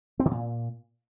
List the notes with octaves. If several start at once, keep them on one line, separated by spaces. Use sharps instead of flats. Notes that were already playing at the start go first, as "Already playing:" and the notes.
C4
D3
A#2